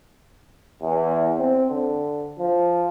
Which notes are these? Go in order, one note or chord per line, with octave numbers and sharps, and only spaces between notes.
E2
C4
D3
F3